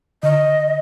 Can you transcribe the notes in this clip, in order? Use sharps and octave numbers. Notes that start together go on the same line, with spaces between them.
D3 D#5